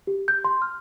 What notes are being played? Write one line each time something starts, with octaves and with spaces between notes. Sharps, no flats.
G4
G6
C6
F6